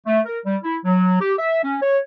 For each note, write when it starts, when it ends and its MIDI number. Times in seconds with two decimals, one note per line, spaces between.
0.06 0.21 57
0.26 0.39 70
0.46 0.57 55
0.64 0.77 64
0.85 1.17 54
1.20 1.34 67
1.38 1.63 76
1.64 1.77 61
1.82 1.98 73